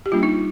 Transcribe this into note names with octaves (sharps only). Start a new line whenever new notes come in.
G4
G3 A#3 D4 F4
D#4